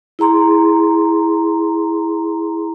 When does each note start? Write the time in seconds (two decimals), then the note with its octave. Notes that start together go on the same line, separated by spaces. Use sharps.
0.19 E4 G#4 A#5 C6